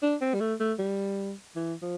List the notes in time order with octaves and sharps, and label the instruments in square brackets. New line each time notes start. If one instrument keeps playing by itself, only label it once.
[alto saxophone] D4
C4
G3
A3
A3
G3
E3
F3